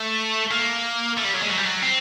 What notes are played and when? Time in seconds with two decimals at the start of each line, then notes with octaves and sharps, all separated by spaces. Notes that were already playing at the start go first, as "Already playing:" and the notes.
Already playing: A3
0.51 A#3
1.17 A3
1.24 G3
1.34 F#3
1.41 G#3
1.50 F#3
1.57 G3
1.64 F#3
1.83 C4